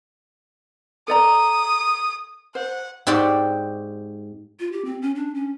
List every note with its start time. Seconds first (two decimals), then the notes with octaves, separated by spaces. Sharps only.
1.08 A4 D5 A#5 D#6
2.55 C5 F#5
3.07 G#2 C4 F#4 G4 D5 C6
4.60 F4
4.72 G4
4.85 C4
5.02 C#4
5.15 D4
5.35 C#4